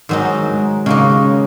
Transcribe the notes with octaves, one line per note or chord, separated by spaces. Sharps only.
G#2 D#3 F#3 D#4
G#3
C#3 G#3 A#3 D#4
C#4